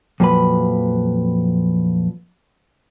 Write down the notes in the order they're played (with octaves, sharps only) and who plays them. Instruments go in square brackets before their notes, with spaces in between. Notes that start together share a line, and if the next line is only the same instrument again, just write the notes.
[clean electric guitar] F2 A#2 F3 F#3 B4 B5